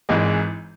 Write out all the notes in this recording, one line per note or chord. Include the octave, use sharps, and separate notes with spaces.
G#1 G#2 E3 G#3